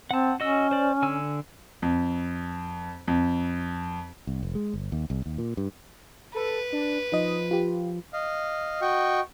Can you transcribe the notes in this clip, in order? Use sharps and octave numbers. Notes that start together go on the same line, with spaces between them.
C4 F#5 A5
C#4 F#4 D#5 E6
C5 D5
D3 G#5 E6
F2
F2
C2
F1
G#3
G1
D#2
C2
D#2
A#2
G2
A4 B4
D4
F3 D#4 D#5
F4 G4
D#5 F5
F#4 D#5 G5 C#6